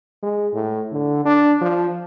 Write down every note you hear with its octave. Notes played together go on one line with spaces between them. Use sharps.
G#3
A2
D3
D4
F3